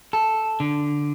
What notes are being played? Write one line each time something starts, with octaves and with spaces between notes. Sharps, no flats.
A4
D3